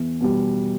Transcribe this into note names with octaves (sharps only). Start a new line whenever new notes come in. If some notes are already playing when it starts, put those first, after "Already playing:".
Already playing: E2
B2 G3